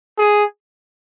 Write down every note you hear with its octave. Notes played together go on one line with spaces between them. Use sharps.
G#4